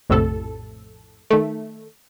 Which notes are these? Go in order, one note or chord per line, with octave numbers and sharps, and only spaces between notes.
A#1 F2 A2 C3 A4
D#3 A3